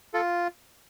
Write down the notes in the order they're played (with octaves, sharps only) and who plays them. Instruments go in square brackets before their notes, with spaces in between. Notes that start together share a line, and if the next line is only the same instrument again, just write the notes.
[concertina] F4 A4